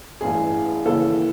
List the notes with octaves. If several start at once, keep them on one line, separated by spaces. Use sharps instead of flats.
A1 G2 E3 G#4
D#2 C#3 E3 A4